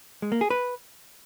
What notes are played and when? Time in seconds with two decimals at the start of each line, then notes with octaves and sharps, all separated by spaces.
0.22 G#3
0.32 A#3
0.41 G#4
0.50 B4